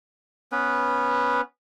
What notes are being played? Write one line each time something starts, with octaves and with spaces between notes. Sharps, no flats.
B3 C#4 B4